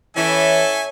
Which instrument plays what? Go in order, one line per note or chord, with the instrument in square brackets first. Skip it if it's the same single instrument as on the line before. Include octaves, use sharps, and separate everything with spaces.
[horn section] E3 [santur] C#4 C#5 [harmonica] A4 E5 G#5